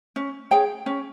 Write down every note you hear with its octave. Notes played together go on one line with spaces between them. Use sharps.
C#4
G#4 C#5 G5
C#4